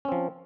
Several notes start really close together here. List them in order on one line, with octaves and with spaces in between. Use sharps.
C#4 C4 F3